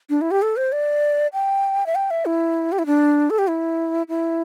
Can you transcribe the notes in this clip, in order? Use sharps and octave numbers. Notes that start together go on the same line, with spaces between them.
D4
E4
G4
A4
C5
D5
G5
E5
G5
E5
E4
G4
E4
D4
A4
G4
E4
E4